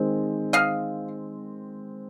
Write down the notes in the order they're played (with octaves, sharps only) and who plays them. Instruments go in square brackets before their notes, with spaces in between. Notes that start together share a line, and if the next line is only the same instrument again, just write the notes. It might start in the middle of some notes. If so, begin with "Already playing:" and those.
Already playing: [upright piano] D#3 G#3 C4
[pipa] D#5 F5